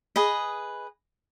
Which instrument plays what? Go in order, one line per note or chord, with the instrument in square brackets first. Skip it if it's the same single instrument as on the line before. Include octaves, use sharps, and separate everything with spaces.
[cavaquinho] G#4 B4 D#5